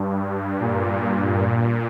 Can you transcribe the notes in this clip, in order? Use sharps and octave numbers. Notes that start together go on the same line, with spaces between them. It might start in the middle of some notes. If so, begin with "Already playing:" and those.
Already playing: G2
A#2
A#2